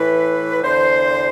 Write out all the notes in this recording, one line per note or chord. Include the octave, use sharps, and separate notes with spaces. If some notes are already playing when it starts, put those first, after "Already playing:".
Already playing: A2 E3 B4
E2 D3 C5